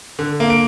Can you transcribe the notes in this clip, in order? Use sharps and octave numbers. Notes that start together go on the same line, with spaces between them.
D3
A#3
D7